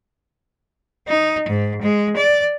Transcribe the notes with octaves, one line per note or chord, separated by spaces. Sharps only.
D#4
G#2
G#3
D5